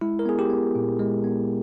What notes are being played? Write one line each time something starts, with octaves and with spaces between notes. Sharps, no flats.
G#3 E4
A#4
B3 G#4
G4
B3
A#2
G#3
B3